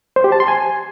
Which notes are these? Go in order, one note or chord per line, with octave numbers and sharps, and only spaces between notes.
C5
G4
A5
C6
G#5